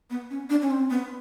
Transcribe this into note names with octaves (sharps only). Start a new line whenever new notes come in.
B3
C#4
D4
C#4
C4
B3